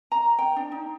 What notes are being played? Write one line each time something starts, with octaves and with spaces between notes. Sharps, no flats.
A#5
G5
D4
D#4